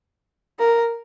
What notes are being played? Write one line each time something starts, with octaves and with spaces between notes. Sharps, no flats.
A#4